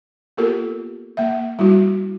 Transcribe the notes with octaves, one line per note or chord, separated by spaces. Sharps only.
A#3 B3 F4 G4 A4 A#4
A#3 E5
G3 E4 F#4